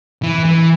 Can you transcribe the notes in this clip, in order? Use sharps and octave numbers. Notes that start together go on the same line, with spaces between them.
E3
E3